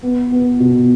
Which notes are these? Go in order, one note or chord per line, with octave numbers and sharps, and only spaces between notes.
B3
B3
B2